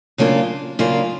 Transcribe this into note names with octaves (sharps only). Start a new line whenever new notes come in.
C#3 F#3 A#3 D4 F4
C#3 F#3 A#3 D4 F4